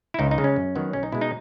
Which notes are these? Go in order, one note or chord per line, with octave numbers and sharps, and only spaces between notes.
E4
C#2 D#4
D#4
C#3 G#3
C#4
F#2
D#3 F#3 B3
B1 C#4
D#4
B2 G#3 E4
D#4